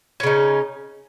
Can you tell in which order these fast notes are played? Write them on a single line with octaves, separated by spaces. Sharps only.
C#4 C#3 D#4